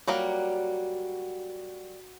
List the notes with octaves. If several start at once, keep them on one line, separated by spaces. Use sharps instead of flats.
F#3 G3 A#3 F#4